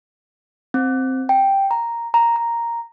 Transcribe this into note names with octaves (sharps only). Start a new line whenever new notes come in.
C4
G5
A#5
A#5
A#5